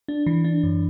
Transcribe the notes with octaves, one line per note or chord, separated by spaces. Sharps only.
D4
E3
D4
F#2